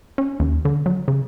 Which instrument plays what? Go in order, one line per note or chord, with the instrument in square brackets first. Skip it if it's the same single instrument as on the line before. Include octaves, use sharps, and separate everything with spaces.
[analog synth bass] C#4
D#2
D3
F#3
C#3